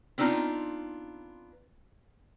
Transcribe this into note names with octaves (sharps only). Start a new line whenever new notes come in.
B3 C4 D4 D#4 F4